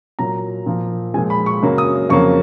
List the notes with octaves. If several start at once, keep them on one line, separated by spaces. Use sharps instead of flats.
A#2 F#3 A#3 A#5
A#2 F3 A#3
A#2 F3 G#3 G#5
B5
C#6
F#2 C#3 F#3 A#3
D#6
F2 C#3 F#3 A#3 C#6